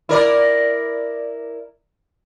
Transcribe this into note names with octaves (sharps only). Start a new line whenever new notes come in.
E4 A#4 D5